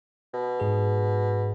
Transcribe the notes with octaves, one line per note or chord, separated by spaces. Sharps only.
B2
G#2 G#4